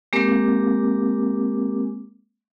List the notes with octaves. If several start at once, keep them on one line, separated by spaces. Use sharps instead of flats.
G#3 A#3 C4 G4 A#4 D6